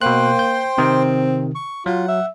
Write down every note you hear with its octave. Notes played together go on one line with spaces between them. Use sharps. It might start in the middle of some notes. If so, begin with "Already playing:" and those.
B2 A#3 C5 G5 C6 F#6
G6
C3 D#3 C4
C#6
F#3 F4 F#5
E5